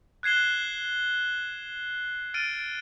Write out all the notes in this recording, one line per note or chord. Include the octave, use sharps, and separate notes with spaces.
F#6 G#6 C7 E7 G7
F6 A6 D7 D#7